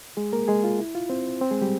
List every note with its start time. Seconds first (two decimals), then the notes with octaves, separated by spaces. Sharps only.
0.17 G#3 G#4
0.33 A#3 A#4
0.48 G#3 G#4
0.64 F4
0.79 E4
0.95 F4
1.09 C4 C5
1.41 C4 C5
1.51 G#3 G#4
1.62 G3 G4